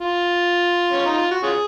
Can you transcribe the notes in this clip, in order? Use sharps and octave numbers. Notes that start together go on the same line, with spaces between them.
F4
C#4
D#4
F4
F#4
C#4 F4 G#4